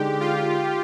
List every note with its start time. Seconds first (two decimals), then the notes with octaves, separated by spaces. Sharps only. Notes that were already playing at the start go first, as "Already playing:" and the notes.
Already playing: D3 G#3 D#4 G4
0.20 F4